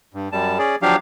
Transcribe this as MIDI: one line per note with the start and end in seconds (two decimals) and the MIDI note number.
0.14 0.29 43
0.32 0.58 42
0.32 0.58 55
0.32 0.58 81
0.59 0.76 61
0.59 0.76 68
0.59 0.76 74
0.82 0.96 53
0.82 0.96 54
0.82 0.96 62
0.82 0.96 67
0.82 0.96 77